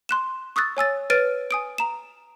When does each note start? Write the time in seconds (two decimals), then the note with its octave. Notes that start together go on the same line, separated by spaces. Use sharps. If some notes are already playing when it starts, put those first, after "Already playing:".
0.09 C6 F#6 E7
0.56 C#6 D#6 E6 F#6 A6
0.77 C#5 G#5 E6 A6
1.10 B4 C#5 F6 A6 D7 D#7
1.51 G#5 D#6 D7
1.78 A#5 E7